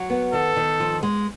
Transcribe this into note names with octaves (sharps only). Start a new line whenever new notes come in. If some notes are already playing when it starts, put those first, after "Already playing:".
Already playing: F#3
B3
D#3 A4
D#3
F3
G#3